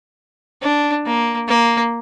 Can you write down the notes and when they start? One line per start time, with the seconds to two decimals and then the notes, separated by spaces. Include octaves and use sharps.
0.62 D4
1.06 A#3
1.48 A#3